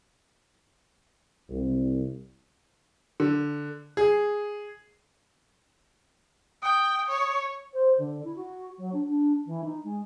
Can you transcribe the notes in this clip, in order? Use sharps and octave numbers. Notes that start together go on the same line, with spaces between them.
C2
D3
G#4
G5 D#6
C#5
C5
D3
E4
F#4
F#3
D4
D4
E3
D#4
G#3